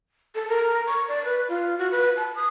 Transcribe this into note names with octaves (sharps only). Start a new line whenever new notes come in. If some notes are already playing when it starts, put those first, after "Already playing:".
A4
A#4
C#6
D5
B4
F4
F#4
B4
A5
D#6